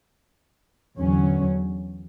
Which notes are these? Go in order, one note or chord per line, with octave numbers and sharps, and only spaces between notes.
E2 D3 F#3 C#4